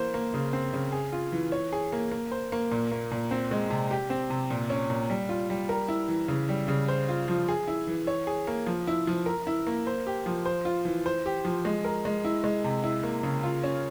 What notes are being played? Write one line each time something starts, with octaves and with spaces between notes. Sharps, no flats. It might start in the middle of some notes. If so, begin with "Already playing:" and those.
Already playing: E3 A#3 C5
A#3
C#3
C4
C#3
G#4
F4
E3
C#5
G#4
A#3
A#3
C5
A#3
A#2
A#3
A#2
C4
G#3
C3
G4
C4
C3
A#2
C#4
A#2
G3
F4
G3
A#4
E4
E3
C#3
G3
C#3
C5
F4
F3
G#4
E4
E3
C#5
G#4
A#3
F3
E4
F3
A#4
E4
A#3
C5
G4
F3
C5
F4
E3
C5
G4
F3
G#3
A#4
G#3
E4
G#3
C3
E4
A#3
C#3
F4
C#4